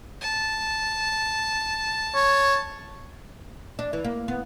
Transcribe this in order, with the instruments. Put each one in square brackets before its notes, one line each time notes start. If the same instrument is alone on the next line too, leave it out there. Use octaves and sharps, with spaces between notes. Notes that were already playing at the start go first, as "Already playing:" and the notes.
[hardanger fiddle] A5
[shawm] C#5
[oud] D4
E3
A#3
B3